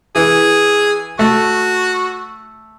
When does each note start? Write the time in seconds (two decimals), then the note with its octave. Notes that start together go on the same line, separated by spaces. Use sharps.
0.16 E3 G#4
1.19 A3 F#4